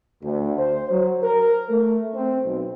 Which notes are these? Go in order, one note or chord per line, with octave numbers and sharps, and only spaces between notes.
D2
C5
F#3
A#4
A3
C4
B1